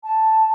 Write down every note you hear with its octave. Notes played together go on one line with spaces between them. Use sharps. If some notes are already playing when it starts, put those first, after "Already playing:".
A5